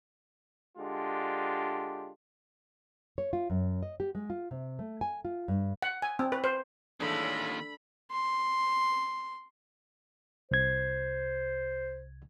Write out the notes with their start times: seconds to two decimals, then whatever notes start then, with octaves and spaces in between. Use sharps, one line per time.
0.78 D3 G#3 D4 F4 G4
3.18 C#5
3.33 F4
3.50 F#2
3.83 D#5
4.00 G4
4.15 G#3
4.30 F4
4.51 C3
4.79 A3
5.01 G#5
5.25 F4
5.48 G2
5.82 F#5
6.02 G#5
6.19 C4
6.32 B4
6.44 C5
7.00 D#2 A2 E3 G#3 D4 F4 A4 B5
8.11 C6
10.51 C2 C5 G#6